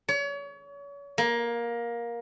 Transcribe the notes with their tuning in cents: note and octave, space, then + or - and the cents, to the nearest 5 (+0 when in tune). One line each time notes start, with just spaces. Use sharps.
C#5 +35
A#3 +15